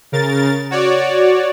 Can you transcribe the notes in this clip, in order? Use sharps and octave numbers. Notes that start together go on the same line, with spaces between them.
C#3 A#4 A6
F#4 C#5 D5